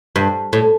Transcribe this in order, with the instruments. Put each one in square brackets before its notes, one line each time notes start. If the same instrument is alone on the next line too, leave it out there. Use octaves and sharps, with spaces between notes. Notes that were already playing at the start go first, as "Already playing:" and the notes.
[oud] G2
A2